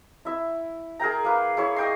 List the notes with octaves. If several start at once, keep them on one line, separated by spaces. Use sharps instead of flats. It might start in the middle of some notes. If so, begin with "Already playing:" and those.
E4 E5
G#4 A#4 G5 A#5
A#3 B4
E4 G#4 C#5
D#5 G5 C6